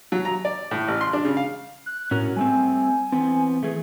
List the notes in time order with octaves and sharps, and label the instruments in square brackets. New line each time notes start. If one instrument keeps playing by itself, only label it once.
[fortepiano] F#3
A#5
D5
A2
A1
C6
D4
C#3
F5
[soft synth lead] F#6
[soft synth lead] A2 [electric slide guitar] C#4 F#4 A#4
[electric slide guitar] G3 A3 C4 [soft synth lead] G#5
[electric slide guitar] E3 B3 C4
[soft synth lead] E3 [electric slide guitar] A3 G#4